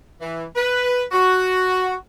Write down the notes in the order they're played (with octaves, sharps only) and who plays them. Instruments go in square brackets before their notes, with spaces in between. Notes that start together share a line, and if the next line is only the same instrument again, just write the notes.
[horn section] E3
B4
F#4